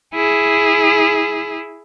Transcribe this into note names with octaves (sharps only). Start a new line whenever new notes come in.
E4 G#4